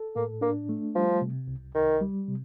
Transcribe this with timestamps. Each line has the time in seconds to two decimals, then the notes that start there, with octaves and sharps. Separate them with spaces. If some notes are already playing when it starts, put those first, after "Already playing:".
Already playing: A4
0.16 A2 A#3
0.41 A#3 D4
0.69 A3
0.95 F3 G3
1.22 C3
1.48 C2
1.75 C2 D#3
2.01 G3
2.28 C3